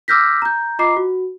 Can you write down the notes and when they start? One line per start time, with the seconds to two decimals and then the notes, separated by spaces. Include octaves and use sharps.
0.08 D6 E6 F6 G6 A#6 B6
0.42 A#5 G6
0.79 F4 D#5 A#5 D6 C7
0.97 F#4